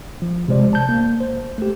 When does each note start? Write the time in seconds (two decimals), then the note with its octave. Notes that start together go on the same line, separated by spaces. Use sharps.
0.22 F3
0.48 C3 G#3 C5 D5
0.73 A5 G6
0.89 A#3
1.21 C5
1.58 A3 G4